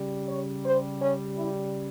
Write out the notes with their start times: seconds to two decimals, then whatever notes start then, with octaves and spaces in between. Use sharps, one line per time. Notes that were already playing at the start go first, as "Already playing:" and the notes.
Already playing: C#3 G3
0.29 C#5
0.64 C5
1.01 C#4
1.37 E4